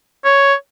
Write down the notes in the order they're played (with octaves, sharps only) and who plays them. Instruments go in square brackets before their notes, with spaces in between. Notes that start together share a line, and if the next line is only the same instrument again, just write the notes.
[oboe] C#5